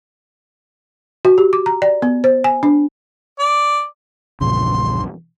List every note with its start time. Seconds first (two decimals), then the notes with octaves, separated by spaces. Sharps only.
1.25 F#4
1.38 G4
1.53 D6
1.66 A#5
1.82 D5
2.02 B3
2.24 C5
2.44 G#5
2.63 D4
3.39 D5
4.41 A#1 E2 G2 A#2 C#3 C6